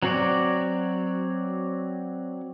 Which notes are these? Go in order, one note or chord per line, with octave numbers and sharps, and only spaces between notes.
F#3 C4 F#4 C#5 D5